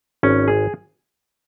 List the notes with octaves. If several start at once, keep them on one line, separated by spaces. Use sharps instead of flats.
G#1 C#4
G#4